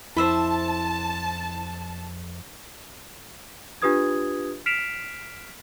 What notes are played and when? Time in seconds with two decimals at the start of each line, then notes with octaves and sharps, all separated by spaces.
0.17 F2 E4 C5 E5 A5 B5
3.82 D4 F4 G4 B4 D#6 G#6
4.66 F6 B6 C7 D7 E7 F7